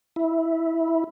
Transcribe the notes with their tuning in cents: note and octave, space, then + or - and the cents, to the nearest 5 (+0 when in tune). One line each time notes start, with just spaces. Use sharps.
E4 -10